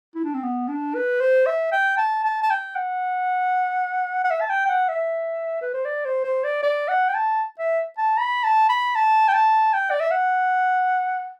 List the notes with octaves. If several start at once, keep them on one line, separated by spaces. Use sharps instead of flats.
E4
D4
C4
B3
D4
B4
C5
E5
G5
A5
A5
A5
G5
F#5
F#5
E5
A5
G5
G5
F#5
E5
B4
C5
D5
C5
C5
D5
D5
F#5
G5
A5
E5
A5
B5
A5
B5
A5
G5
A5
G5
D5
E5
F#5